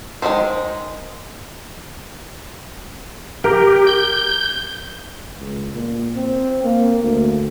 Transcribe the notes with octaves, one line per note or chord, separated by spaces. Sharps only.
D#3 G#3 C4 C#4 C5
G4 A#4
G6
C#2
A#2
C4
A#3
D2